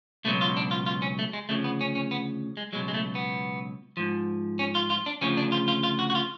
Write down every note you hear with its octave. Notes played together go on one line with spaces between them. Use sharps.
C#2 B2 F#3 A3
F4
D4
F4
F4
C#4
A3
G#3
D2 C#3 F3 A3
B3
C#4
C#4
B3
G#3
C#2 B2 F#3 G#3
G#3
A3
B3
G#2 F3
C#4
F4
F4
D4
D2 C#3 F3 C#4
D4
F4
F4
F4
F#4
F#4
F4